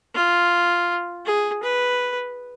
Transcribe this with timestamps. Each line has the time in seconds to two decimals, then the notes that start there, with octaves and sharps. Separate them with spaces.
0.15 F4
1.25 G#4
1.63 B4